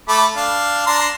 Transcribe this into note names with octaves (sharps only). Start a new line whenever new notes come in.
A3 B5 D6
D4 F5
D4 A#5 C6